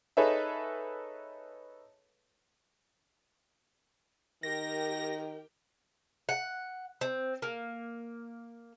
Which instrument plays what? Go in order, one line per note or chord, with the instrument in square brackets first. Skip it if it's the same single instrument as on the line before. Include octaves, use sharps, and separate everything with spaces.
[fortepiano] D#4 G#4 A4 B4 C#5 E5
[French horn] D#3 [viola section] G4 A#4 G5 [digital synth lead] A#6
[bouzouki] F#5
C4
A#3